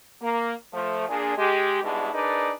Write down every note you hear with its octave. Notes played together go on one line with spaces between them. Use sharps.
A#3
F3 A3
A#2 D4 G#4
G#3 G4
G#2 B2 G3 G#3 D4 E4
D4 D#4 G#4 A#4 B4 D5